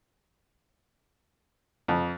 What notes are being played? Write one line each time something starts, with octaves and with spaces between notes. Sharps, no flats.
F2